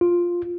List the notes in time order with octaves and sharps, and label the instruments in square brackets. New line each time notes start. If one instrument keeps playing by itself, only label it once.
[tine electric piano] F4